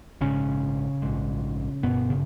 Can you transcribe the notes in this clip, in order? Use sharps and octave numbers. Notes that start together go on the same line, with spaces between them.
A#1 G#2 C#3 C#4
A#1 G#2
G1 G2 B2 B3
C#3